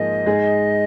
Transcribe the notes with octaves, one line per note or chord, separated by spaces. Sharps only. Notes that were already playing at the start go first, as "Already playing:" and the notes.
Already playing: G#2 F3 A#3 G#4 D#5
G#2 G#3 D#4 G#4